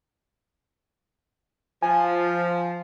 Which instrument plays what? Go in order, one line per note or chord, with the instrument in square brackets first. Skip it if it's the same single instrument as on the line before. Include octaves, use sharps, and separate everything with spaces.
[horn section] F3 [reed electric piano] G#5